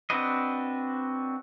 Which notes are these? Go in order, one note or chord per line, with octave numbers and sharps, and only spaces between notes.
C4 D4 F#4 B4 D#5